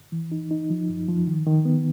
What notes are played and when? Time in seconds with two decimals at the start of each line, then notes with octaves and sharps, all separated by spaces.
0.12 E3
0.32 D#4
0.51 D#4
0.70 F3
0.89 F#2
1.09 F3
1.27 D#3
1.47 D#3
1.65 B3